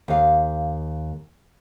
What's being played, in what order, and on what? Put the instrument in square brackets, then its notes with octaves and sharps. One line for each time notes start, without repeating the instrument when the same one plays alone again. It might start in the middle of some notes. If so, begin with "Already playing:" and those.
[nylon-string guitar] D#2 F5